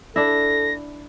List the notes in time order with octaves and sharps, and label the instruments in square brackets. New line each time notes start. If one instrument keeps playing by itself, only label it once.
[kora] D4 E4 [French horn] A4 [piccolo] A#6